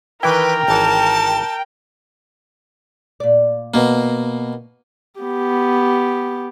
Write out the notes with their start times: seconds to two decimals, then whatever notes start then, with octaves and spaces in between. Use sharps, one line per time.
0.23 D#3 E3 E4 A#4 B4 G5
0.68 G#1 E3 C#5 A5
3.20 A#2 D5
3.74 B2 A#3
5.20 B3 G4